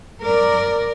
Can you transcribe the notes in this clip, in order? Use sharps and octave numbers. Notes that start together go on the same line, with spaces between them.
A#4 D5